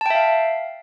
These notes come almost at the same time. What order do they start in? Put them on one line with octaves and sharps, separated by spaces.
A5 G5 E5 F5